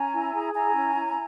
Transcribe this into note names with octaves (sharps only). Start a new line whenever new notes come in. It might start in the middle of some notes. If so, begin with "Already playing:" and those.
Already playing: C#4 G#5 A#5
E4
G#4
E4 G#5 A#5
C#4
E4